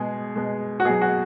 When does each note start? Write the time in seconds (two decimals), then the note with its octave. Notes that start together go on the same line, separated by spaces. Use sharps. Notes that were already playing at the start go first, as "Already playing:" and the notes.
Already playing: B2 G#3 G#4
0.36 B2 G#3
0.80 F#4
0.85 B2 F#3 G#4
1.01 F#4